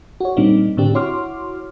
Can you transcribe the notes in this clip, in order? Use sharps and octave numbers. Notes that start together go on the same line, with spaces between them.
F#4 C#5
A#2 G3 A#3 C4 D4 D#4
A2 D3 C4 D4 G4
E4 F#4 C#5 C6 D6 F6